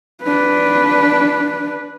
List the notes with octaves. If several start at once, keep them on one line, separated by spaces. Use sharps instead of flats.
D4 B4